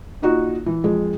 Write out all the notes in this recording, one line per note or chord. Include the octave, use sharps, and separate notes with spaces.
A#2 D#4 F#4
E3
F2 G#3